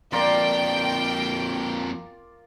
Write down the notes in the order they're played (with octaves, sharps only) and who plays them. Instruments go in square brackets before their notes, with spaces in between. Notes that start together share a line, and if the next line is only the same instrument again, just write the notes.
[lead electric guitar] F2 A#3 [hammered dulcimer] F4 A#4 D5 [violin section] G5